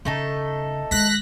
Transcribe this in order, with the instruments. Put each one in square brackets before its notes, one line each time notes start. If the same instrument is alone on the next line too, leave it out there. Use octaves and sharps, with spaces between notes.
[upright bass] C#3 [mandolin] A3 D#4 A4
[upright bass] D#3 G#3 [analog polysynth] F#6 A#6 B6